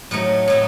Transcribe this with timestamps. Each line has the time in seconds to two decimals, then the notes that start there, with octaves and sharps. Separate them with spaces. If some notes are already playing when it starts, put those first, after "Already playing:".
0.11 A2 F#3 A3 D#4
0.48 A2 F#3 A3 D#4